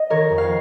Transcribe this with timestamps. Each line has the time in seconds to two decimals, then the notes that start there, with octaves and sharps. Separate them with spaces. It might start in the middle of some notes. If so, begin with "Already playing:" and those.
Already playing: D#5
0.10 D#3 A#4 C#5
0.30 F2
0.38 F5